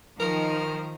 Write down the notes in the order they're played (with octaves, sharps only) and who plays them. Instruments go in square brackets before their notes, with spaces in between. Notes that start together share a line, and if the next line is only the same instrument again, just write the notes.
[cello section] D#3 F3 [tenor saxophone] A#4